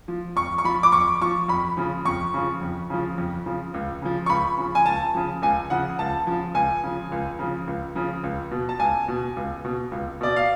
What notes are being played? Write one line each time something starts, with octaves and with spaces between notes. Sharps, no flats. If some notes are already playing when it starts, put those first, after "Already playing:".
F3
F2 C#6
C#6
F3 B5
D6
F2 C#6
F3 C#6
F2 B5
C#3 F3
F2 C#6
C#3 F3
F2
C#3 F3
F2
C#3 F3
C#2
C#3 F3
C#6
C#2 B5
C#3 F3
G#5
C#2 A5
C#3 F3
C#2 G#5
C#3 F3 F#5
C#2 A5
C#3 F3
C#2 G#5
C#3 F3
C#2
C#3 F3
C#2
C#3 F3
C#2
B2
A5
C#2 G#5
B2
C#2
B2
C#2
B2 D5
F5